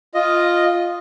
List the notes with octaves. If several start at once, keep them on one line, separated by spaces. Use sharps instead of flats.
F4 D#5